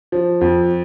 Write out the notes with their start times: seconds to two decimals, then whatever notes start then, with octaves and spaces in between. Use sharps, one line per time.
0.12 F3
0.41 F2